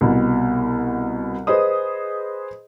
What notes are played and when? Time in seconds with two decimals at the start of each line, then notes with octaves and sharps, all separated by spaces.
0.01 C2 B2
1.47 G#4 B4 C5 D#5 D#6